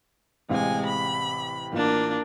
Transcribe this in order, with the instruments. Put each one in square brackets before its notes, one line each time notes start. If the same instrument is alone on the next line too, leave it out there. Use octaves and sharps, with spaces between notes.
[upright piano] A1 C3 F5 [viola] G#3 G#5
[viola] B5
[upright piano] A1 F4 E7 [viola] A#3 D4